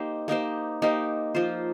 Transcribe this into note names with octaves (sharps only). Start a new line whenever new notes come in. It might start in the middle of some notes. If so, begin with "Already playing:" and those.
Already playing: A#3 D#4 G4 C5
A#3 D#4 G4 C5
A#3 D#4 G4 C5
F3 A#3 F4 C5